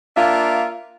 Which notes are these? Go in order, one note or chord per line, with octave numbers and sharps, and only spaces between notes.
A#3 D4 F4 E5